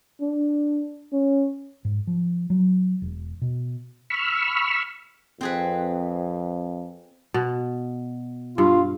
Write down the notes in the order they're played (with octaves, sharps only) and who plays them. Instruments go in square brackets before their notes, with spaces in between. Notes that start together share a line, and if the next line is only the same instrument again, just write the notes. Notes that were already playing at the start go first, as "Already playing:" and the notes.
[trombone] D4
C#4
[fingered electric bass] G#2
F3
F#3
E1
B2
[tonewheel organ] B5 C#6 E6 F6
[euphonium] F2 [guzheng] C4 G#4 B4
[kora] B2
[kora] G2 [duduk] F4